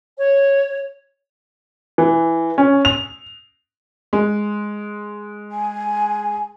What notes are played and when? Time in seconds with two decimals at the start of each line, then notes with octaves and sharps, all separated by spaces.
0.19 C#5
1.98 E3
2.58 C#4
2.85 F7
4.13 G#3
5.52 G#5